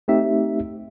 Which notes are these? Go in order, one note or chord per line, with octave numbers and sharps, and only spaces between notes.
A3 C4 D#4 G4 E5